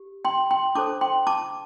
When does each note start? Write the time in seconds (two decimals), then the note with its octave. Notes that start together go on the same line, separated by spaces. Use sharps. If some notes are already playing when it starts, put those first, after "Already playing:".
Already playing: G4
0.25 G5 C6
0.51 G5 C6
0.75 D4 A4 C5 A5 D6
1.01 G5 C6
1.27 A5 D6